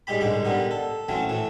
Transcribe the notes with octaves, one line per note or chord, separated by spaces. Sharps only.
G#2 G3 G#3 G4 B5
C2 G#2 D3 G#3 D6
D3 G3 B3 A#4
A4
E3 F#3 A3 C4 C#4
A2 E3 A3